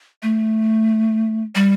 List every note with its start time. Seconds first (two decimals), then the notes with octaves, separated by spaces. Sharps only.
0.23 A3
1.55 G3